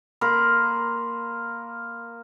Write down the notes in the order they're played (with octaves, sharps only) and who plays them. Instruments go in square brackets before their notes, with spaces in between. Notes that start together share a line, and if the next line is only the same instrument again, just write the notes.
[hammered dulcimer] A#3 A#4 [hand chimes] B5 C6